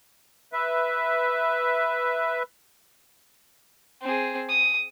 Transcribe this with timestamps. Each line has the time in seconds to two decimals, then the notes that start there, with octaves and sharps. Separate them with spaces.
0.53 B4 E5
4.02 C4 G#4
4.49 D#6